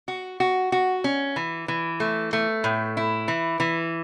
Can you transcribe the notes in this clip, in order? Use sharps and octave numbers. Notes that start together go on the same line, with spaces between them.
F#4
F#4
F#4
C#4
E3
E3
A3
A3
A2
E4
E3
E3